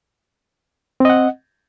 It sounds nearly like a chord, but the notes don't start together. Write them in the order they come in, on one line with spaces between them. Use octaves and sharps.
C4 D#5 F#5